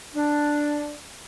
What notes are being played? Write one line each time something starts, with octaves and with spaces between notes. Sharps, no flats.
D4